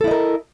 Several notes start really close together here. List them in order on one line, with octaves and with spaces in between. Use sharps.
A4 E4 D#5 A#4